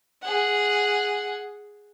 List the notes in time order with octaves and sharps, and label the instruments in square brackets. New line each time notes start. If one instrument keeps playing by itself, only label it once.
[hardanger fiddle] G#4 F#5